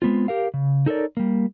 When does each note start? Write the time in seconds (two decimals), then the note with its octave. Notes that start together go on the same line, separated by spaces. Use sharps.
0.02 G#3 B3 C4 F4
0.28 G4 A#4 F5
0.54 C#3
0.86 D#4 A4 A#4 C#5 D5
1.17 G3 A#3